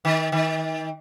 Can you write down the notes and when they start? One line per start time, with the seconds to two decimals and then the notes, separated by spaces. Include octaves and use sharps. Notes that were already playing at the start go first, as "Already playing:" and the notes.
0.05 D#3
0.32 D#3